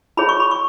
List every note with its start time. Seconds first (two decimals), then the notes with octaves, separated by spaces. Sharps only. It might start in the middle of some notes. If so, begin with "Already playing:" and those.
0.17 E4 G#4 C#5 B5
0.29 C#6
0.40 B5
0.51 C#6